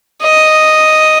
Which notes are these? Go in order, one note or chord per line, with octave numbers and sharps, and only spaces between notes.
D#5